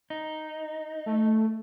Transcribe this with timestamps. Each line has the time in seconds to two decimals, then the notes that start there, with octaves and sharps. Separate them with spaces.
0.10 D#4
1.06 A3